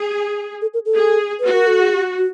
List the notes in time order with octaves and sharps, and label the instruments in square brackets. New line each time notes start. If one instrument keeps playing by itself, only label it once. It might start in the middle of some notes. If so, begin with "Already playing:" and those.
Already playing: [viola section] G#4
[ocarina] A4
A#4
A4
[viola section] G#4
[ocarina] B4
[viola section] F#4
[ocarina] A#4
A4
G#4
G4
F#4